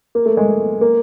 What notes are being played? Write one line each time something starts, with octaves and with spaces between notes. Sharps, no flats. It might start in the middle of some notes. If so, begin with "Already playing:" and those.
A#3
A3
G#3
A#3